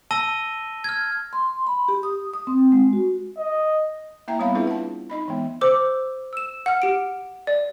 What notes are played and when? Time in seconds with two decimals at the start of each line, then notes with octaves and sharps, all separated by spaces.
0.11 A5 E6 A#6 D#7 G7
0.84 F6 G#6
1.33 C6
1.67 B5
1.88 G4
2.03 D#6
2.34 D#6
2.47 C4
2.72 G#3
2.93 F#4
3.38 D#5
4.28 A#3 E4 E5 G5 A#5
4.39 G3 B3 C4 C#5 F5 B5
4.55 D4 E4 F4 G#4 B4 E5
4.67 F#5 A5
5.10 D#4 D#5 B5
5.28 E3 G#3 B3
5.61 C5 D6 E6
6.33 E6 E7
6.66 F#5 F6
6.82 G4 D7
7.47 D5